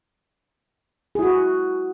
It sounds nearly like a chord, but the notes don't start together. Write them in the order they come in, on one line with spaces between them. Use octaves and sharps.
G#4 E4 F#4